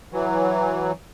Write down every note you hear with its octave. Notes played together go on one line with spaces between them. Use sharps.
E3 F#3